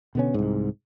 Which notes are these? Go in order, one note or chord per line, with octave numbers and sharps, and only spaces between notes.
B2 D3 B3 C#4
C2 G#2